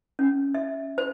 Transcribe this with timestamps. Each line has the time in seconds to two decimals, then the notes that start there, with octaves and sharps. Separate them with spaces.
0.19 C#4
0.55 E5
0.98 C5